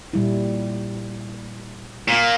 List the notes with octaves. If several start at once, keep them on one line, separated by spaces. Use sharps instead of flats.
A#2 G3 E4
A#2 A#3